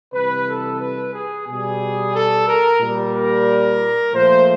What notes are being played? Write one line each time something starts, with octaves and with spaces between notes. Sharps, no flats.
C3 E3 G3 B4
A4
B4
G#4
B2 G3 G#4
A4
A#4
A#2 G3
A#4
A#2 F3 A3 C5